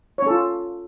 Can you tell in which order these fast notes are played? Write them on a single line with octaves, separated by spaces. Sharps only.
C#5 C#4 A4 F4